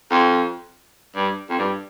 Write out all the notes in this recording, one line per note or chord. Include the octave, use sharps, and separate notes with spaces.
F2
G2
F2
G2